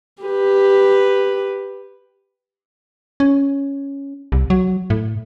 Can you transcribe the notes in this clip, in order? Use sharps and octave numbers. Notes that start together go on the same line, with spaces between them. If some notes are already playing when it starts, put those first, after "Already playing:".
G4 B4
C#4
C2
F#3
A2